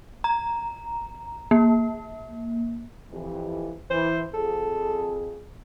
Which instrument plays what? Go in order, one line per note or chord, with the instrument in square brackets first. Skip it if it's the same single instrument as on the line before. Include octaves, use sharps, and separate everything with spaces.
[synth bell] A#5
A#3
[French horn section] F2 E3 G4
[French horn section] E3 [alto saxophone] C5
[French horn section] F2 G#4 [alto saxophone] A4